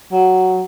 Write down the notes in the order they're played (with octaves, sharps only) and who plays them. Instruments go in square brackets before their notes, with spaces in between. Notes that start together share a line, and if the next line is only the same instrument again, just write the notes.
[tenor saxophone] F#3